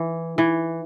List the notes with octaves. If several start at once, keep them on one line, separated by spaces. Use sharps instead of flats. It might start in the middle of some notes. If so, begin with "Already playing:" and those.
Already playing: E3
E3